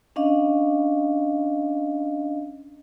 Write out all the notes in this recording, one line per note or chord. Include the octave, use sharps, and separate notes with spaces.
C#4 D4 D#5 F5